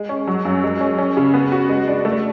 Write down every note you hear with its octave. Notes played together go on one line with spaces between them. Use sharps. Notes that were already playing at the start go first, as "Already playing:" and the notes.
Already playing: G#3
C#4
F#3
F#2
G#3
C#4
C#4
C#3
B3
F#4
G#3
D4
A3